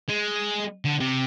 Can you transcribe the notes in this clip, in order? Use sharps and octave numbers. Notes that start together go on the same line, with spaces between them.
G#3
D3
C3